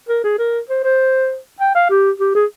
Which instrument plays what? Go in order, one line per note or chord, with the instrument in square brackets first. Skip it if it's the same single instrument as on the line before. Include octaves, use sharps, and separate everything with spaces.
[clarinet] A#4
G#4
A#4
C5
C5
G5
F5
G4
G4
G#4